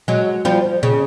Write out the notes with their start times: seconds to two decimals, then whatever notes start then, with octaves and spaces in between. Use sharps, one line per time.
0.08 F#3 G#3
0.45 F3 G3
0.83 C#3